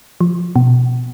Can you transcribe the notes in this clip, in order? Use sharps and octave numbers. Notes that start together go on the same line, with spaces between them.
F3
B2